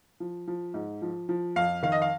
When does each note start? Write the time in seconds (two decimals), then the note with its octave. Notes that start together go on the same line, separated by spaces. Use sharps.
0.20 F3
0.48 F3
0.74 G#2
1.02 F3
1.29 F3
1.56 F2 F5
1.83 D#3 F5
1.92 D#5
2.02 F5